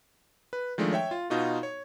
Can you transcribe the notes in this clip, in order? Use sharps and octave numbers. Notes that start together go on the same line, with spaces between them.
B4
D#3 F3 G#3 A3 D4
C#5 E5 G5
F4
B2 D#4 F4 F#4
C#5